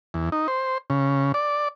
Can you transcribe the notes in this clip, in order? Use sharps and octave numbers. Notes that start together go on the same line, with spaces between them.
E2
D#4
C5
C#3
D5